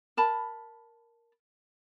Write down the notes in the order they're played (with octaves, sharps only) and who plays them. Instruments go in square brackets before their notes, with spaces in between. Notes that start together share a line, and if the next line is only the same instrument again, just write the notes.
[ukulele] A#4 A5 B5